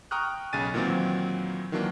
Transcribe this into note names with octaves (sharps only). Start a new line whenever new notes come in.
G5 A#5 C#6 D#6 F6 F#6
B1 C#3 G#5 A6 D#7
A#2 D#3 E3 F#3 C4
D#3 E3 F#3 A#3 D4 F4